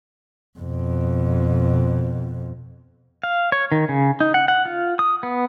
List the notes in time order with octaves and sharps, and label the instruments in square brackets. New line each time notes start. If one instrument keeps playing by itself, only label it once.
[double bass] F2 B2
[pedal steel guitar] F5
C#5
D#3
C#3
D#4
F#5
F#5
F4
D#6
B3